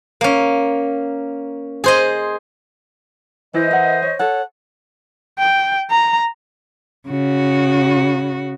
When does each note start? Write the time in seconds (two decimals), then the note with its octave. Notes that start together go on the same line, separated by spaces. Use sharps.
0.21 A#3 C#4
1.84 G#4 C5 D#5
3.54 E3 E4 C5 D#5
3.71 A#4 F#5
4.02 C#5
4.19 A4 C#5 F#5
5.39 G5
5.91 A#5
7.08 C#3 F#4